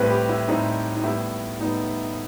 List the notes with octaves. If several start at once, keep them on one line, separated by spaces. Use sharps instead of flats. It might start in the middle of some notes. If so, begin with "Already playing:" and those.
Already playing: A2 G3 C4 B4
G4
E4
A2 G3 C4 D#4
D#4
A2 G3 B3 E4
A2 G3 B3 D#4